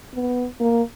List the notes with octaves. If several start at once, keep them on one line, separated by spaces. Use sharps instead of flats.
B3
A#3